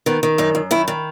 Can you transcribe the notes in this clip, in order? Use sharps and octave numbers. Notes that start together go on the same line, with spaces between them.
D#3 B3
D#3
F#2 D#4
F#2
D#3 E4
D#3